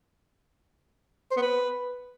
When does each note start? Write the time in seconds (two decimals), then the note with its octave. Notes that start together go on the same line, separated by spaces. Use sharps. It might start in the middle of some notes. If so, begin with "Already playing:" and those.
1.31 C5
1.37 B3
1.42 B4